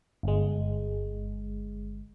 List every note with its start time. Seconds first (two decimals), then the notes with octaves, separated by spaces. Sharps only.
0.23 G1 G#3